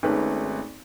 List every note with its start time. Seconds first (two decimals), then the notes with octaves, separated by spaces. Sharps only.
0.03 G#1 G#2 A3 C#4 B4